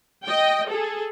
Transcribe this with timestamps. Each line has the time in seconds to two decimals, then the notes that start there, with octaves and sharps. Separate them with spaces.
0.24 D#5 G5
0.69 G#4 A4